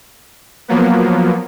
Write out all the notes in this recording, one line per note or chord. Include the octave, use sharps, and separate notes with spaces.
F3 F#3 A#3 B3